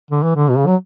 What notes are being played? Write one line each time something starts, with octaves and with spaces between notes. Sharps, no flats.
D3
E3
D3
B2
C#3
F#3